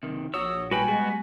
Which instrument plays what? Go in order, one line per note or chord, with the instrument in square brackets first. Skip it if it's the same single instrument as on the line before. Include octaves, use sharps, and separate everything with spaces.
[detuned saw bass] F#1 [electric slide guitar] C3 D#3
[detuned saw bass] A#1 [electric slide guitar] F#4 C#5 [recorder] D#6 [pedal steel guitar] E6
[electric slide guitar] G3 [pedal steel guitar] F#4 B4 G5 [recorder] G#5
[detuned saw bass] G#3 [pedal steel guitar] B3 F#4